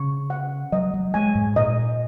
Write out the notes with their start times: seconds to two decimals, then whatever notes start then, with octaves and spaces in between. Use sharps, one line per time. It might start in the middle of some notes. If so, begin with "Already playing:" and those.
Already playing: C#3 C#6
0.30 F#5
0.72 F#3 D#5
0.94 F#3
1.14 G#3 G#5
1.35 G#2
1.56 A#2 D#5